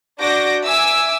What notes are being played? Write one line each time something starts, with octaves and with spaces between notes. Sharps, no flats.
D4 F#4 D6 G6 A#6
E5 G#5 D6 E6